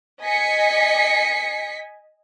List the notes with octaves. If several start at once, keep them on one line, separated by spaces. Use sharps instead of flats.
D#5 G#5 B6 C#7